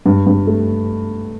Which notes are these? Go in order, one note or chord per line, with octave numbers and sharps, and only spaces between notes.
G2
G2
A3